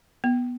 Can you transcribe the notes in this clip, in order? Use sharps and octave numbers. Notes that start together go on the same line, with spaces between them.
B3